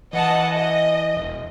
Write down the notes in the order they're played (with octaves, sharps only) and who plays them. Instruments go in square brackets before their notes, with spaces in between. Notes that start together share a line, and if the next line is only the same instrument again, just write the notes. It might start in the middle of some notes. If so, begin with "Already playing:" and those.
[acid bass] E3 [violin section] D#5 F#5 A5
[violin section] D#5
[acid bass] E1